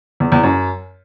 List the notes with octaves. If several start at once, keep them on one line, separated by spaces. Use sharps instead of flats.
E2
E2
F#2